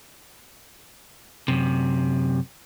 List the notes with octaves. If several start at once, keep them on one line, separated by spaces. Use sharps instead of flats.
F#2 C3